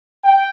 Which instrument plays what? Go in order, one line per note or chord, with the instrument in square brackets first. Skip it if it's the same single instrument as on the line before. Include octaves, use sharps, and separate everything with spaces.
[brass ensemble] G5